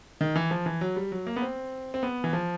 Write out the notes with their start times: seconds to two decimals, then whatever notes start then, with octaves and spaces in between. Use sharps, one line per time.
0.21 D#3
0.36 E3
0.51 F3
0.66 E3
0.81 F#3
0.96 G3
1.12 F#3
1.27 A#3
1.36 B3
1.42 C4
1.94 C4
2.03 B3
2.24 E3
2.33 F3